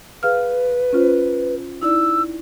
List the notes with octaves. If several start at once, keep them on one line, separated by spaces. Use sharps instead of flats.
G#4 B4 F5 F6
C#4 F4 C5
D#4 E4 D5 E6